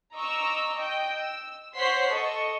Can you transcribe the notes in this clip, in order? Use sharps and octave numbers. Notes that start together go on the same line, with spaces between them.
D#5 A#5 C#6 D6 E6
D#5 G5
E6
C5 C#5 F#5 C6 B6 C7
A4 D#5 C#6